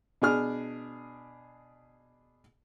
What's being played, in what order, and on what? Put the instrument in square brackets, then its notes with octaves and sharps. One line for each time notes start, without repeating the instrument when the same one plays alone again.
[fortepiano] B2 D4 G#4 F6